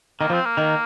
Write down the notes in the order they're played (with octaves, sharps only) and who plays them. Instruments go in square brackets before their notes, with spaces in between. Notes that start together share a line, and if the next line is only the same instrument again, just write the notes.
[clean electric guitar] D#3 [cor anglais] A#3
[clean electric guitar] F3 [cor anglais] C4
[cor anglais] A#3
[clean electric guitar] D#3